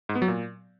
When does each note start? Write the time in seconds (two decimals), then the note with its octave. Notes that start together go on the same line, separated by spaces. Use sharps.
0.09 G#2
0.15 B3
0.22 F#3
0.28 A#2